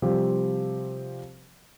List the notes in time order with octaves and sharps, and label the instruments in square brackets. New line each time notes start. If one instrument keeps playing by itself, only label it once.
[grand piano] C3 F3 G3 C4 G4